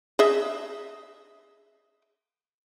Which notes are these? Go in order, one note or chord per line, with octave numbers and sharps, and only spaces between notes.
G#4 D#5 E5